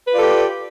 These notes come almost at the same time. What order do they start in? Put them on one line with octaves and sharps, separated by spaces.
B4 F4 D5 A4 G4